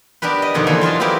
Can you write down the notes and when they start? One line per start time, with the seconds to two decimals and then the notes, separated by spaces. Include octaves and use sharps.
0.22 B3 D4 G4 A#4 B4
0.42 D#5
0.54 F2 B2 D3 D#3 F3
0.67 E2 A#3 A4 G#5
0.81 F#3 F4 D#5 A5
1.00 B3 C4 E4 G4 A#4 B4